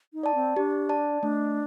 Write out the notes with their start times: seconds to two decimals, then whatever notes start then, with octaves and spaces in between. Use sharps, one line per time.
0.13 D#4
0.23 D5 A5
0.35 C4
0.56 D4 G4
0.89 D5 A5
1.22 A3 D4